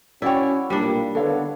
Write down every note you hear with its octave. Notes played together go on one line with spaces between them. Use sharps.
C#4 E4 F#4 C#5 D5 F5 G5
B1 A#2 G3 A#3 D4
D3 D#3 B3 A4 C#5 F5